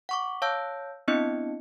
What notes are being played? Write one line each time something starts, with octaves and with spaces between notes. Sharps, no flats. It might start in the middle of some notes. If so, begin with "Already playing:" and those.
F#5 C#6 D6
C#5 F5 A5 E6 G6
B3 C4 D4 E4 D#5 C#7